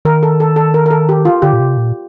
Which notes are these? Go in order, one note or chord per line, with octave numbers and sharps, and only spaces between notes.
D#3 A#4
A4
A4
A4
A#4
A#4
A4
G4
F4
D3 G4
A#2
C3
A#2